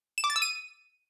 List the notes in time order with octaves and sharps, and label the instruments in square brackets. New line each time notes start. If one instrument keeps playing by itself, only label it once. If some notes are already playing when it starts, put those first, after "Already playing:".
[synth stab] E7
D6
A6
E6
D#7